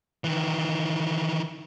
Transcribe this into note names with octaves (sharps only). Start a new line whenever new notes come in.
D#3 E3